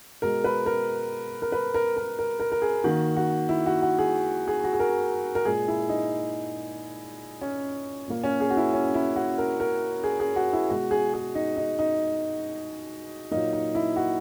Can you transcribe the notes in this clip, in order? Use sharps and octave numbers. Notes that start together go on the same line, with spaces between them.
B2 G#3 A#4
B4
A#4
A#4
B4
A#4
A#4
A#4
A#4
A#4
G#4
D#3 A#3 F#4
F#4
E4
F#4
F#4
G#4
G#4
F#4
G#4
A#4
A#4
A#2 G#3 G#4
E4
D#4
C#4
A#2 A#3
C#4
G#4
F#4
E4
C#4
E4
F#4
A#4
A#4
G#4
G#4
F#4
E4
B2 G#3 F#4
G#4
G#4
D#4
D#4
D#4
A#2 F#3 A#3 D#4
D#4
E4
F#4